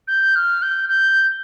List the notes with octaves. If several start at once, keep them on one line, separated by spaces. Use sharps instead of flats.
G6
F6
G6
G6